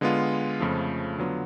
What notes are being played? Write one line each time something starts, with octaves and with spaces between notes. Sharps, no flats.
D3 G#3 B3 F4
F2 C#3 F3 A3
D3 F#3 B3 F4